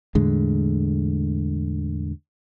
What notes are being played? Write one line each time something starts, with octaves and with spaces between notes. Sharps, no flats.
E2 A2 D3 G#3